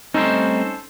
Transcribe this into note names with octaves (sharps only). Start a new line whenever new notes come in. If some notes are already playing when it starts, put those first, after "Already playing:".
G3 A3 C4 C#4 D#4 A4 C5